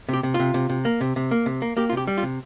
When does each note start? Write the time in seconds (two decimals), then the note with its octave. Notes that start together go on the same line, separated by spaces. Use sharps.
0.09 C3 G4
0.23 C3
0.34 F4
0.40 C3
0.54 C3
0.70 C3
0.85 A#3
1.01 C3
1.16 C3
1.31 A#3
1.46 C3
1.62 A#3
1.77 A#3 G4
1.90 F4
1.92 C3 G4
2.08 G3
2.18 F4
2.23 C3